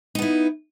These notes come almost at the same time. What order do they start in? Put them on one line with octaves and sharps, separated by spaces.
D#4 B3 E4